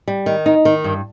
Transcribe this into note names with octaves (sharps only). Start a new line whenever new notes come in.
G3
D#3
D#4
D#3
G2